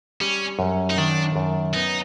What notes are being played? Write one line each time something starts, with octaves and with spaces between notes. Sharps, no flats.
G3 C#4
F#2
D#4
D#3 D4
F#2
B3 D#4